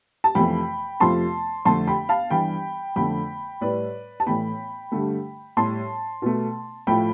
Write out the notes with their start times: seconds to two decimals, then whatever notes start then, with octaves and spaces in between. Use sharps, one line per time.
0.24 A5
0.35 F2 C3 E3 A3 G5 B5
1.00 F2 C3 F3 A3 A5 C6
1.65 F2 D3 A3 A5 C6
1.87 G5 B5
2.09 F5 A5
2.31 G2 E3 G3 G5 B5
2.96 F2 D3 A3 G5 B5
3.61 A2 G3 B4 D5
4.20 A5
4.26 A2 E3 A3 G5 B5
4.92 G2 D3 A3
5.57 A2 G3 A5 C6
6.22 B2 A3
6.87 A2 F3 A3 G5 B5